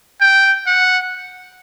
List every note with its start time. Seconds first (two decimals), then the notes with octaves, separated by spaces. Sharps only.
0.21 G5
0.67 F#5